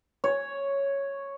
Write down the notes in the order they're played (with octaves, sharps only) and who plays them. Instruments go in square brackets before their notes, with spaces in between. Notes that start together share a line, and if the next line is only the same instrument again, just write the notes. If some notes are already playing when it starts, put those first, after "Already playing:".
[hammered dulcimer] C#5